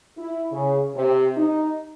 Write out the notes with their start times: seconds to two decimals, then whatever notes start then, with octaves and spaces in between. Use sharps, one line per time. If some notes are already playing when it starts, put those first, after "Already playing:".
0.17 E4
0.51 C#3
0.95 C3
1.37 D#4